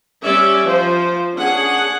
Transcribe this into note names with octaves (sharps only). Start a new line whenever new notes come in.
G3 C#4 D5 E5
F3 C5
C#4 D4 G#4 F#5